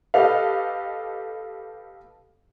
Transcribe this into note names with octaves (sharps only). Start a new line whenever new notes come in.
G4 A4 B4 D#5 F5